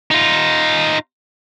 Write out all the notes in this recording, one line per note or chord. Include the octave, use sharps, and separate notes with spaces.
D#4 F4